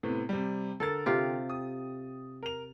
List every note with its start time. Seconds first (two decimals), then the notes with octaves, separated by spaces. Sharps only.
0.03 A2 C3 B3
0.29 C3 G3
0.80 D3 A4 A#4 A6
1.06 C3 F4 G4
1.50 D#6
2.43 A#4 F7